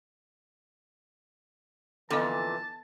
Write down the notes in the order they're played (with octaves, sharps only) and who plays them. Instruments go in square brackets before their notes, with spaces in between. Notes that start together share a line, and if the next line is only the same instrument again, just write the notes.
[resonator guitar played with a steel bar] F2 A#2 D3 [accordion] E3 [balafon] B3 A4 D#5 [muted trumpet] A5